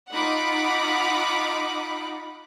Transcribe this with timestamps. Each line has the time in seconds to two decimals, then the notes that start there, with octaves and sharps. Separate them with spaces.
0.13 D#4 F4 F#5 B5 D6